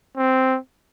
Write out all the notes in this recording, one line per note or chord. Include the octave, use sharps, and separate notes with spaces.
C4